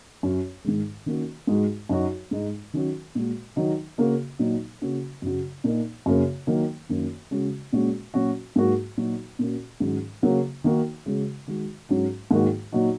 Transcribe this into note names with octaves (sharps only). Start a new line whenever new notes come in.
F#2 F#3 C#4
G#2 D#3 G#3
D#3 A#3 C#4 F#4
G#2 G#3 D#4 F#4
F#2 F#3 D#4 F#4
G#2 G#3 D#4
D#3 F#3 C#4 F#4
A#2 G#3 F#4
D#3 F#3 D#4
C#3 A#3 F#4
A#2 F#3 D#4
C#3 A#3 C#4 F#4
F#2 C#3 F#3
A#2 A#3 D#4
F#2 C#3 A#3
D#3 F#3 A#3
F#2 D#3 A#3 C#4
C#3 G#3 C#4 F#4
A#2 G#3 C#4 F#4
A#2 F#3 C#4 F#4
G#2 F#3 A#3 F#4
A#2 F#3 D#4 F#4
A#2 A#3 C#4 F#4
G#2 D#3 F#3 C#4
C#3 F#3 A#3 F#4
D#3 A#3 D#4 F#4
C#3 G#3 F#4
D#3 G#3 F#4
G#2 F#3 C#4 F#4
G#2 D#3 F#3 A#3 F#4
A#2 F#3 D#4 F#4